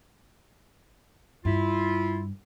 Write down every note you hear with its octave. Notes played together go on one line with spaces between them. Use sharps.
G2 E4 F4